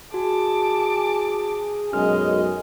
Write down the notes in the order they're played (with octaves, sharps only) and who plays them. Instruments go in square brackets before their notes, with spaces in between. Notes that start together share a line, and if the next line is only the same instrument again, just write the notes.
[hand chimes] F#4 [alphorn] G#4 [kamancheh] A5 D6
[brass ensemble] B1 F#2 [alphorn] G#3 [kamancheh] D#5 [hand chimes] F6